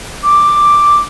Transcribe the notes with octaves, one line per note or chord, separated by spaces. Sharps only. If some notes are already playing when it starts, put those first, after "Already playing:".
D6